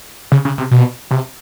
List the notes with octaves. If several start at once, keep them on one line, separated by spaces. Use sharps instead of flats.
C#3
C#3
C3
B2
C3